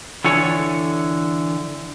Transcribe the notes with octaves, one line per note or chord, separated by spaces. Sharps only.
D3 E3 A4 C#5